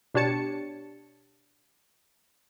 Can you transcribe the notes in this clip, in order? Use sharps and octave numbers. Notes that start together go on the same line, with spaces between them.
B2 D4 G4 C#5 A5 C#7